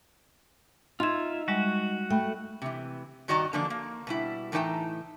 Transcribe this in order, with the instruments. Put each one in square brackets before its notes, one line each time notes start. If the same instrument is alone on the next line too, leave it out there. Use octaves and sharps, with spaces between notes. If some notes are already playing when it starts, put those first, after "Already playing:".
[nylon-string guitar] D#4 [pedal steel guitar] F4 E5 [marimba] C6 G#6
[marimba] G3 G#3 E5 [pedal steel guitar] F#4
[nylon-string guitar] A3 [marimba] G5 B5
[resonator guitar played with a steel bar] C3 E3
G2 D#3 F#4 D5 D#5 A#5
D3 E3 F3 A#3 D4
A#3
B2 G3 E4
A2 E3 D#4 C5 G5 A5